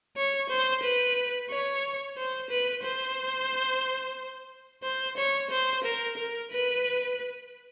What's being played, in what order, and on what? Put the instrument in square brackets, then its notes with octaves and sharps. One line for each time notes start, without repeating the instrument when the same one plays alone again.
[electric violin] C#5
C5
B4
C#5
C5
B4
C5
C5
C#5
C5
A#4
A#4
B4